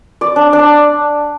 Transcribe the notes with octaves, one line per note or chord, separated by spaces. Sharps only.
D5
D4
D4